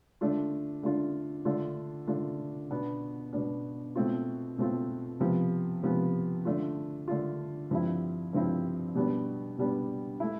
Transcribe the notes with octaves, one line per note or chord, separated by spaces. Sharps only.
D3 A3 D4 F4
D3 A3 D4 F4
D3 A3 D4 F4
D3 A3 D4 F4
B2 B3 D4
B2 B3 D4
B2 A3 C4 F4
B2 A3 C4 F4
C3 F3 B3
C3 F3 B3
D3 A3 D4 F4
D3 A3 D4 F4
G2 F3 C4 E4
G2 F3 C4 E4
B2 G3 B3 D4
B2 G3 B3 D4
A3 E4